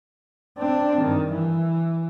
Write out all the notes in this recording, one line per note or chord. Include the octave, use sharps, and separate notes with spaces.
C4 D4
G2 D#3
E3